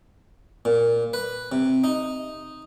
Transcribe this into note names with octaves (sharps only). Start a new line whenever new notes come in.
A#2
B4
C3
D#4